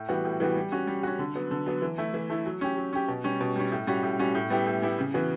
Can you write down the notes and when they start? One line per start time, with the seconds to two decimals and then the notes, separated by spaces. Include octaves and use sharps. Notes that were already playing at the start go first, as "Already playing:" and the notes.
Already playing: A2
0.09 E3 G3 B3 F#4
0.25 A2
0.40 E3 G3 B3 F#4
0.56 G3
0.72 C#4 F#4
0.87 G3
1.03 C#4 F#4
1.19 D3
1.35 F#3 B3
1.51 D3
1.66 F#3 B3
1.82 E3
1.98 A3 E4
2.14 E3
2.30 A3 E4
2.46 F#3
2.61 C#4 G4
2.77 F#3
2.93 C#4 G4
3.08 B2
3.24 G3 C#4
3.41 B2
3.56 G3 C#4
3.72 A2
3.87 G3 C#4 F#4
4.03 A2
4.19 G3 C#4 F#4
4.35 A2
4.50 G3 B3 E4 G4
4.67 A2
4.82 G3 B3 E4 G4
4.99 C#3
5.14 E3 B3 F#4